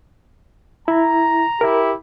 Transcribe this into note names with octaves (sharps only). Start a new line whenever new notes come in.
E4 A#5
E4 G4 A#4